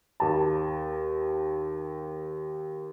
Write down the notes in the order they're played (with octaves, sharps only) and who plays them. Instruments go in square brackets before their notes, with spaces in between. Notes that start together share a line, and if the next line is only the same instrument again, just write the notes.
[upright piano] D#2 A5